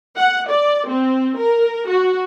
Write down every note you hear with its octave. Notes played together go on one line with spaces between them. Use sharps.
F#5
D5
C4
A#4
F#4